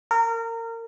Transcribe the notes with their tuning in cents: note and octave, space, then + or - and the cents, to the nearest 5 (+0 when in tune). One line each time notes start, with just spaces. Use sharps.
A#4 -25